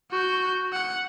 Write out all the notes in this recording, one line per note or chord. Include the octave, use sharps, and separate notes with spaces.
F#4 G6
F#5